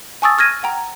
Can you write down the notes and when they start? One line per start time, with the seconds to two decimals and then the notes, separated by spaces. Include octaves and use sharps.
0.22 G#5 A5 C#6 D#6 E6 A6
0.38 C#6 F6 G#6 A#6 D#7
0.63 F#5 G5 A#5